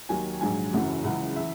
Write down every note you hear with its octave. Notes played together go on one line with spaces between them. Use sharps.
D#2 D#3 F#3 G#5
A#1 G#2 F#3 G#5
F#1 F#2 E3 F#5
C#2 C#3 E3 F#5
E3 E5